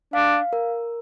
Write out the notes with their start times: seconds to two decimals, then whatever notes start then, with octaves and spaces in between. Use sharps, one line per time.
0.13 D4 F5
0.53 A#4